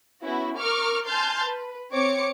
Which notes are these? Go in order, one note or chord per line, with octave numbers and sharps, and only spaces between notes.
B3 C#4 E4 F#4
A#4 C#6 D6 F6
G#5 A5 C6 F6 G6 A6
B4
C4 C#5 D6 C#7